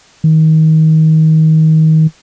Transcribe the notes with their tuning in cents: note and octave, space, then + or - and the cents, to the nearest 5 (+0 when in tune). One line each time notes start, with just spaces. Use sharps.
D#3 +25